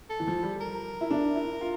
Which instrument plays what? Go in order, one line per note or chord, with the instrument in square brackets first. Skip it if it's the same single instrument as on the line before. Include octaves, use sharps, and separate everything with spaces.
[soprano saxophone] A4
[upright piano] E3
F3
G3
[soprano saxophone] A#4
[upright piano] E4
D4
E4
F4